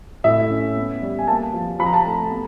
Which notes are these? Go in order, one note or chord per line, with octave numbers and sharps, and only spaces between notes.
A2 E5
C#4
B3
G3
G#5
A#3 A5
F3
F3 B5
A#5
A5
A3 A#5
B3